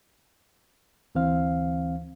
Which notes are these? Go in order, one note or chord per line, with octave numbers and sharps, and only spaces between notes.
D2 E3 C4 F5